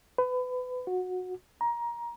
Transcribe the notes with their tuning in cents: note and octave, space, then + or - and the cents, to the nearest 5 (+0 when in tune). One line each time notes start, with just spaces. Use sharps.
B4 +30
F#4 -15
A#5 +20